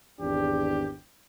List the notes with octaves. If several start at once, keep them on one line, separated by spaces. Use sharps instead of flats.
G#1 E2 D4 G4